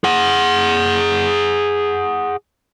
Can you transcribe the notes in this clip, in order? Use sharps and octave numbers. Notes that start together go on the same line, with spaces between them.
G#4 F#5